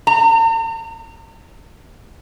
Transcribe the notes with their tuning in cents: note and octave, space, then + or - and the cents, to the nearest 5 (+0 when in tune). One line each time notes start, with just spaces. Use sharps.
A#5 -45